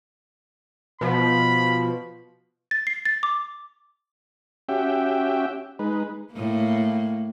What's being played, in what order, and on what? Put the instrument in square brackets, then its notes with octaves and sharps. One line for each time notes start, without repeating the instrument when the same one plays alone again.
[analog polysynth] B2 F3 [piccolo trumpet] B5
[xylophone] A6
C7
A6
D6
[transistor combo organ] C#4 F#4 G4 E5 G5
G#3 D#4 B4
[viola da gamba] A2 A#3